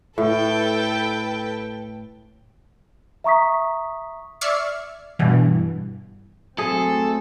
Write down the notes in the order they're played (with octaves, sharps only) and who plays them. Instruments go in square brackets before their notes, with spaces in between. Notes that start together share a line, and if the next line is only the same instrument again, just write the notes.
[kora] A2 [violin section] A4 B4 G5
[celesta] E5 A#5 C#6 D#6 B6
[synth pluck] D5 E5 C#6 F6 G#6 C7
G2 B2 E3
[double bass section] F#3 A3 C4 [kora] G#4 [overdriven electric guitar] A4